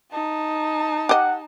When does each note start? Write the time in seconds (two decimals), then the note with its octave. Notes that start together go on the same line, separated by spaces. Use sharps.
0.12 D#4 A5
1.09 G4 D#5 F#5